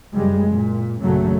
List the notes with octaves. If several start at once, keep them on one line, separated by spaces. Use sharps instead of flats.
F#1 G3 G#3
A#2
A#1 F#2 C#3 F#3 A3